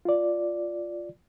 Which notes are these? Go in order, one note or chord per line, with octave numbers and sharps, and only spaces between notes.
F4 D5